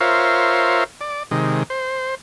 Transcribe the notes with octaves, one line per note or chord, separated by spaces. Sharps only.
F4 A#4 C5 C#5 E5 F5
D5
C3 D#3 G#3
C5